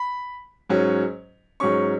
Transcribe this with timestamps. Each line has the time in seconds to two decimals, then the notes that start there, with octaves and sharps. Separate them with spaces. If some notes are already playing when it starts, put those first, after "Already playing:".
Already playing: B5
0.70 G#2 F#3 C#4
1.60 G#2 F#3 C#4 C#6